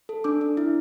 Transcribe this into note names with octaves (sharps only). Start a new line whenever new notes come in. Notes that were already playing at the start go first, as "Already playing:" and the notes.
A4
D4 D6
D4
E4